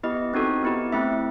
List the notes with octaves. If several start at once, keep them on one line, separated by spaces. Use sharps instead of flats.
B3 E4 G4 D#5
C4 D#4 F#4 A4
B3 E4 G4
A3 C4 E4 E5